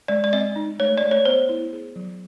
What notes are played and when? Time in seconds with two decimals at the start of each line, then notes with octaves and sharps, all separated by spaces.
0.08 G#3 D5
0.24 D5
0.33 C4 D#5
0.56 D#4
0.79 A3 C#5
0.98 A3 D5
1.11 C#5
1.25 B3 C5
1.49 E4
1.73 G#4
1.96 F#3